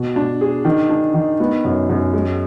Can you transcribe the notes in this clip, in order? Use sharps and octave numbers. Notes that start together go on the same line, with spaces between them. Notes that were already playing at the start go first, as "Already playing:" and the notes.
Already playing: B2
D4
G#4
D#3
D4
D#3
B3
F#2
F#2
G#3